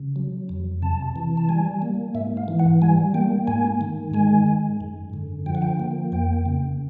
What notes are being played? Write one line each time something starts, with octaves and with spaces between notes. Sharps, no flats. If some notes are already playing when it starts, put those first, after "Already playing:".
Already playing: C#3
F#3
F2
C3 A5
E3
A5
G3 G#5
A#3
G#2 E5
F5
E3
F#5
G3 G#5
A#3 G5
G#2 G#5
D#3
G#3 G#5
G#2
F#2
D3
F3 G5
F#5
G5
A#3
F2 G5
C#3